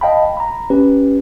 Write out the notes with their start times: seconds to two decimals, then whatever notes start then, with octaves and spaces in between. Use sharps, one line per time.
0.01 D#5 F5 G5 A5 B5
0.37 A#5 B5
0.70 C#4 G4 B4